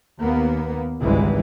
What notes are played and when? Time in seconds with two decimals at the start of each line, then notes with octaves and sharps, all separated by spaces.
0.20 D#2 A#3 B3
1.00 G#1 C#2 G#2 E3 G3 G#3